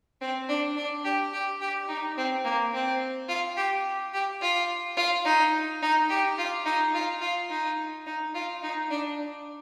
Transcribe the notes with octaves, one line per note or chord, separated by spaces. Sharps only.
C4
D4
D4
G4
G4
G4
D#4
C4
A#3
C4
F4
G4
G4
F4
F4
D#4
D#4
G4
F4
D#4
F4
F4
D#4
D#4
F4
D#4
D4